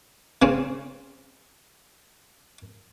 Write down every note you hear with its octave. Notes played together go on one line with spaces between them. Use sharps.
C#3 C4 C#4